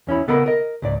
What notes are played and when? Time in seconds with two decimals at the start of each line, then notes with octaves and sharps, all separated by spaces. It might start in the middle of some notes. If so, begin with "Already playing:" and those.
0.07 E2 C#4 E4 B5
0.28 C#3 B3 A4 A#4 D#5 B5
0.46 A#4 D#5
0.82 C#2 G#2 D5